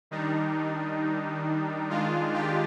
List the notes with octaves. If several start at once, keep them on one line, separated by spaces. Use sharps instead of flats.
D#3 G3 D4 D#4
D#3 G#3 D4 F4
G4